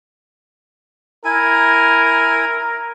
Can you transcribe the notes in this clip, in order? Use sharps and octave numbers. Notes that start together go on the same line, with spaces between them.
E4 A#4 G#5